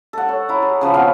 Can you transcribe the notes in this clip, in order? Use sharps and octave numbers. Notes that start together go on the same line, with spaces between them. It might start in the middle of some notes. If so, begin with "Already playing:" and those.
A4 F#5
C#5
E4 A#5
G#4
C#3 F3 B4
B2 C4 F4 F5